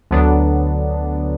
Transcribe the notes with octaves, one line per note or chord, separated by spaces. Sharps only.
D2 D3 F#3 B3 D4